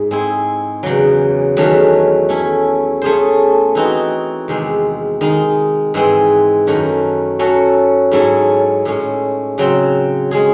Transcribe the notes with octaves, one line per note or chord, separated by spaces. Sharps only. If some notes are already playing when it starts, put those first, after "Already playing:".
Already playing: G#2
G#3 C4 E4 G#4
E2 C#3 F#3
E2 D#3 F#3 A3 C#4
A3 C#4 E4
A3 C#4 G#4 C5
E3 C4 D#4 F#4
E2 C3 D#3 G#3
D#3 G#3 D#4
G#2 E3 G#3 C4
F#2 D#3 A3 C#4 F#4
F#3 C#4 F#4 A4
G#2 F#3 C#4 E4 A4
A2 G#3 C#4
C#3 F#3 C4
G#3 C#4 G#4